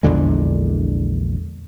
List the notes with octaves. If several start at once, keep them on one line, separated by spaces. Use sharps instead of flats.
A#1 E2 D3 G#3